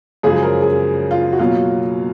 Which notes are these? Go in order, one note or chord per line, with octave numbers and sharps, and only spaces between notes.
F#2 C#3 F3 G#3 G#4
A#4
G#4
F4
F#4
B2 F#3 A#3 F4